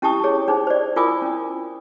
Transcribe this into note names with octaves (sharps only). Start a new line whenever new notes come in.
C#4 E4 G4 A5 C#6 D#6
G#4 C#5
D4 D#4 G#4 C5
C5 D5
E4 F4 A#4 G#5 D6 D#6
C#4